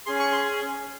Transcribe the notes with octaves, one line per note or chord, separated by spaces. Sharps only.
C#4 G#4 C6
C#6
C6